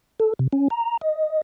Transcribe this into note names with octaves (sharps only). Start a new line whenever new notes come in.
A4
C3
C#4
A#5
D#5